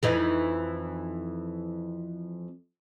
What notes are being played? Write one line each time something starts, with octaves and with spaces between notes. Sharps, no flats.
F2 E3 D#4